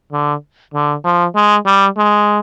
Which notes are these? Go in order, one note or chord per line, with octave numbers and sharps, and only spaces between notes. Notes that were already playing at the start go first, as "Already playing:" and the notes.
D3
D3
F3
G#3
G3
G#3